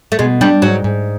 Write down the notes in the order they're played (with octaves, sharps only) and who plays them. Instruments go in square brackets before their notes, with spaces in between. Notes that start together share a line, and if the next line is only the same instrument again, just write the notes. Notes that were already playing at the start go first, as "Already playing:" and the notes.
[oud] A3
[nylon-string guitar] B2 [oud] G#3
[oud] G3 [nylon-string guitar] D4
[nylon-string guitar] G#2 [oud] F#3
[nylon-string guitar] G#2